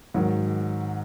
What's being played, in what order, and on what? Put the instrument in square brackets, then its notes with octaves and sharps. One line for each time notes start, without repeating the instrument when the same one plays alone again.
[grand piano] G#2 D#3 F#3